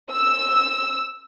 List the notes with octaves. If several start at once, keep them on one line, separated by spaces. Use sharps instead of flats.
E6